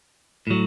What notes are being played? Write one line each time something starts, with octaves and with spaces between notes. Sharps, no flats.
A2 F#3